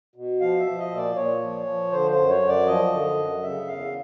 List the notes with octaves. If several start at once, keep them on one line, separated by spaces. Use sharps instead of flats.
B2
F3 F5
E5
F3
D#5
A#2
D5
A#2 C#5
F3
F3
D3 C5
C5
F#2
C#5
F#2
D5
F3 D#5
D3
F#2
C#3 E5
E2 F5